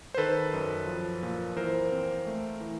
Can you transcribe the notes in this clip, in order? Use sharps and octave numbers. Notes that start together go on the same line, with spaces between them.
C5
D#3 A4 B4
F#2
F3
A#2
E3 A#4 C5
C4
A3
E3